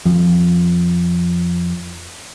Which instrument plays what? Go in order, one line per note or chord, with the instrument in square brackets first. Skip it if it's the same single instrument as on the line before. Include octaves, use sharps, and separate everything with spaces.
[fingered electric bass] F2 F3